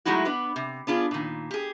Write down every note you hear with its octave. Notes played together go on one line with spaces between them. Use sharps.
F#3 G#3 A3 D#4 E4 F#4
B3 D4 B4
C3
B3 D4 F4 G#4
A#2 D#3
G4 G#4